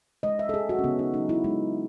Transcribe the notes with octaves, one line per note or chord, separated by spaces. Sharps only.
G#3 D#5
E5
A4
G#3 G#4
F#4
C#4
C#3 B3
D#4
F#3 D#4
E4
G#3 D#4